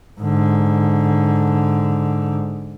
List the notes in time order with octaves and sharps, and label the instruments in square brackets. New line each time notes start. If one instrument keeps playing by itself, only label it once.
[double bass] G#2 D3